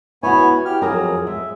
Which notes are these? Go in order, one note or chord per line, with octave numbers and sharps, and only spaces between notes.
B3 E4 F#4 C#5 G#5
G4 F6
F2 F#3 G#4 A#4
G#3 E5